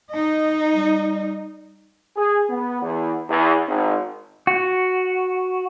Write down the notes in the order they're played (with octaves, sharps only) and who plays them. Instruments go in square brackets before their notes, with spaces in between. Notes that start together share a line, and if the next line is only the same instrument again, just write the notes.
[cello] D#4 D#5
[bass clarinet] G3
[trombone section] G#4
B3
E2
E2
G#1
[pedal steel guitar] F#4